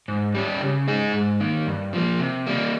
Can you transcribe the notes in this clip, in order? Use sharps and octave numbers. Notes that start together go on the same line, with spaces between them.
G#2
G3 C#4 G4
C#3
G#3 D#4 G#4
G#2
D#3 A#3
G2
F3 A#3
C3
G3 A#3